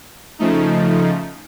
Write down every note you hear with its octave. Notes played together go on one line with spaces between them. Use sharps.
C#3 F3 A3 D#4